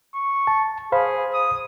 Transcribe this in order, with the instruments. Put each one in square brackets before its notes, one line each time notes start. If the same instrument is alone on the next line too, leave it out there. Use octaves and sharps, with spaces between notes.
[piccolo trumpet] C#6
[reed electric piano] A5
[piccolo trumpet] G#4 [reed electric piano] C5 F5 B5
[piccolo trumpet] D#6